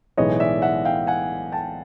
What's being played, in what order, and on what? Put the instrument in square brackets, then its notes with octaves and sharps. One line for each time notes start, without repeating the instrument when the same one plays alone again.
[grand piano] B1 A2 E3 G#3 B3 C#5 D#5
D5 E5
E5 F#5
F5 G5
F#5 G#5
G5 A5